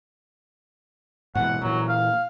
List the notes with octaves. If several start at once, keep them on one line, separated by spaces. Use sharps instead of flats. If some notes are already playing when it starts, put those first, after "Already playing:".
G#2 B2 E3 F#5
A#2 E3 F#3
F5